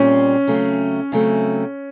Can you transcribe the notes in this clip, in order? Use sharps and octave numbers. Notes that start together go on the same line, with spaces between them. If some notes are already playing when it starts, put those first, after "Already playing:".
Already playing: A#2 G3 C4 C#4 F4
C#3 F#3 A3 C4
C#3 F#3 A3 C4